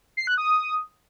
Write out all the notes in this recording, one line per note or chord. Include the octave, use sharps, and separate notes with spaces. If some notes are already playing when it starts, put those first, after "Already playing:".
C7
F#6
D#6